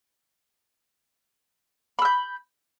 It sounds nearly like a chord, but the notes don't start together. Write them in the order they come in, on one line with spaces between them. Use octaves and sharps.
B5 E6 G6